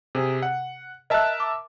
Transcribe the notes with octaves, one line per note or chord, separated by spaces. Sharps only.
C3 G#4
F#5
A#4 D#5 E5 A5 F#6
D6